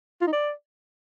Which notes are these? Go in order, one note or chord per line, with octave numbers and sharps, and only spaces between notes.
F4
D#4
D5